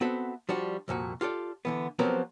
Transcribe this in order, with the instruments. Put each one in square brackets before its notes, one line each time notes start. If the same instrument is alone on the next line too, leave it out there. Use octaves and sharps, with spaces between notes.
[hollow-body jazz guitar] B3 C4 F#4 A4 E5
F3 G3 D4 F#4
C2 F2 A#2 F#4
F4 G4 A4 D5
D3 E3 B3
F3 F#3 B3 C4 G4 A#4